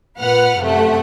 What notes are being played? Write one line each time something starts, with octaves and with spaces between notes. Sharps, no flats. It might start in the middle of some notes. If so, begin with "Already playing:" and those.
A#2 B4 F#5 F6
F#2 C3 A3 F#5